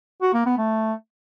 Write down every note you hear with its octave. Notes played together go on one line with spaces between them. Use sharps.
F#4
A#3
B3
A3